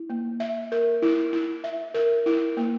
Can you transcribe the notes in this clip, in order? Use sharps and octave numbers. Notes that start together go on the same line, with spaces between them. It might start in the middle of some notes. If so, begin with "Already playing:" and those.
Already playing: E4
A#3
E5
A#4
E4
E4
E5
A#4
E4
A#3